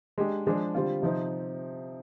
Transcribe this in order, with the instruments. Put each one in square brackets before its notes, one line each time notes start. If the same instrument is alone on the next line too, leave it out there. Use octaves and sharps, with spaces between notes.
[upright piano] G#3 D4 G4
F3 G#3 D4 G#4
D3 G3 C4 F4
C3 F3 C4 D#4